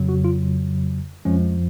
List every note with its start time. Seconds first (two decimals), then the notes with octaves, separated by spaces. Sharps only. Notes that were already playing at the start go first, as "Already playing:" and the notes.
Already playing: F2 C#3 F#3
0.09 F#4
0.24 F4
1.25 F2 F3 G#3 C#4